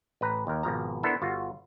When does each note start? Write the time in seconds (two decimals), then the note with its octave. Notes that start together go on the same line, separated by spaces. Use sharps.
0.21 A1 B4 A#5
0.47 D#2 A#4
0.63 G#1 B2 F3 A#5
1.03 B3 D4 E4 A4 A#4 C5
1.22 G1 F4 F#4